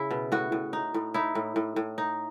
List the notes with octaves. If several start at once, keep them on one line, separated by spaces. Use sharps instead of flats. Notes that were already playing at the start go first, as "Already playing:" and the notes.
Already playing: C#3 E4
B2
A2 F#4
A2
D#4
A2
D#4 E4
A2
A2
A2
D#4